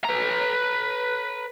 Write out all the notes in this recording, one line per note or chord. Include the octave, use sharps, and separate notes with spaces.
B4 A#5